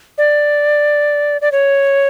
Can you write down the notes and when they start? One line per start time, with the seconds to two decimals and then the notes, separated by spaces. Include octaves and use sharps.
0.18 D5
1.41 D5
1.52 C#5